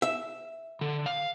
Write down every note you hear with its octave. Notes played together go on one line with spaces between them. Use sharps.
E5
D3
F5